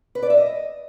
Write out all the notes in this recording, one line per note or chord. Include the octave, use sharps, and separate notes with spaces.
B4
D5
E5
D#5